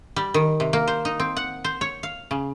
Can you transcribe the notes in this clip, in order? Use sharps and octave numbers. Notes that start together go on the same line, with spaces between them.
G3
D#3
C3
A#3
C5
D#4
C4
F#5
C5
C#5
F5
C#3